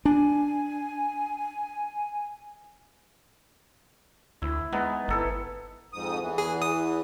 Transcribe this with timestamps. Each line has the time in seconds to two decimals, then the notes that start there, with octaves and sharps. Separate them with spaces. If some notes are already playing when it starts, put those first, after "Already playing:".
0.05 D4 G#5
4.42 D2 E4
4.72 G#3 B3 D#4
5.08 G1 E4 A4 B4
5.93 F2 G#2 D#6
6.20 E2 E3
6.38 G#4
6.62 D#6